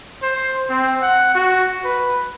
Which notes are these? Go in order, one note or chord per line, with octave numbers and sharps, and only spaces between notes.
C5
C4
F#5
F#4
B4